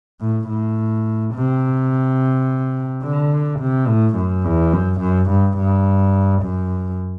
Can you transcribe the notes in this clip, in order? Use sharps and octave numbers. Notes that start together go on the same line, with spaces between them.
A2
A2
C3
D3
C3
A2
F#2
E2
F#2
F#2
G2
G2
F#2